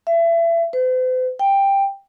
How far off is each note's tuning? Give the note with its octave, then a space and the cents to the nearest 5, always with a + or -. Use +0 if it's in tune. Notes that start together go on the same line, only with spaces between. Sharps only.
E5 +30
C5 -45
G5 +10